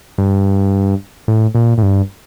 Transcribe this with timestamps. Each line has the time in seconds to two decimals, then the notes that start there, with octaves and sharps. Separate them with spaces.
0.18 G2
1.28 A2
1.55 A#2
1.78 A2
1.83 G2